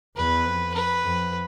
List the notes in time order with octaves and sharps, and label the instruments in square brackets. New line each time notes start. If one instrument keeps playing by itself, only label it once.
[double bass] E2 [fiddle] B4
[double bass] F2
[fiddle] B4
[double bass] F2